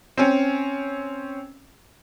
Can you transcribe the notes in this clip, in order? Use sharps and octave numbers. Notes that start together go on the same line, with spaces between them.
C4 C#4